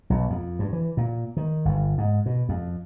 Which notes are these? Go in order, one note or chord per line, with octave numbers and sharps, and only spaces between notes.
B1
F2
G2
E3
A#2
D#3
G1
G#2
B2
F2